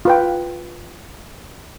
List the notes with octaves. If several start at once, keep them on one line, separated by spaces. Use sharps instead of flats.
F4 B4 G5